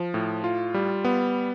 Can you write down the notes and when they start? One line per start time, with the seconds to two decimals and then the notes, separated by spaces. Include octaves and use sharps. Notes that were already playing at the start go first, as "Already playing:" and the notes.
Already playing: F3
0.14 A2
0.44 F4
0.74 G3
1.05 B3